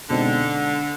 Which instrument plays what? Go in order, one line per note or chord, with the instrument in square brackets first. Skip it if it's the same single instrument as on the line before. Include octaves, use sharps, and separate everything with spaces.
[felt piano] B2 G#3 C4 D#4 [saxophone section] D3